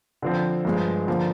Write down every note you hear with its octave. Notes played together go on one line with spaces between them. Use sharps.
D3 F3 C4
G2 F3 G#3
D3 F3 A#3